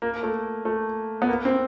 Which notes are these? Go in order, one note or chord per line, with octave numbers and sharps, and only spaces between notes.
A#3
A3
A3
B3
A#3
C4